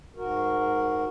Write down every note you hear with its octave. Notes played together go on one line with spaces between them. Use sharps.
G#2 F#4 A#4